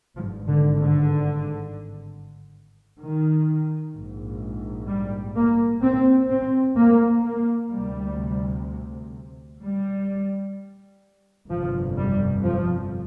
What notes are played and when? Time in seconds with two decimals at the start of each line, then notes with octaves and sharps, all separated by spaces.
0.16 G#1 F3
0.21 G2
0.48 D3
0.79 D3
3.00 D#3
3.94 A#1 G#2
4.89 G3
5.37 A#3
5.84 C4
6.31 C4
6.78 A#3
7.25 A#3
7.73 D2 C3 G3
9.62 G3
11.49 G1 F2 C3 F3
11.97 G3
12.44 F3